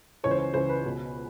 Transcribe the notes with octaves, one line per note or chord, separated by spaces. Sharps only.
C#2 C#3 E3 C#5
C5
C#5
C#2 C#3 E3 C5
B4
C#2 B2